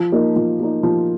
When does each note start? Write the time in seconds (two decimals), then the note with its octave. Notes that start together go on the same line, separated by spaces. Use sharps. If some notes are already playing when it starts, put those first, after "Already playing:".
Already playing: F3
0.12 A#3 D#4
0.36 F3
0.60 A#3 D#4
0.83 F3